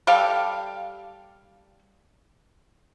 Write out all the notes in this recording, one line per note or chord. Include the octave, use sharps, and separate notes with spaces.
G3 G4 A4 F5